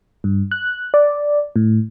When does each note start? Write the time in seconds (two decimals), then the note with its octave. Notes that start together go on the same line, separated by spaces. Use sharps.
0.24 G2
0.51 F#6
0.94 D5
1.56 A2